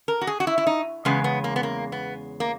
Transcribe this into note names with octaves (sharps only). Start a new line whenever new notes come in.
A#4
F#4
G#4
F#4
E4
E4
D#4
E2 C#3 G#3 B3
B3
A#3
B3
A#3
B3
A#3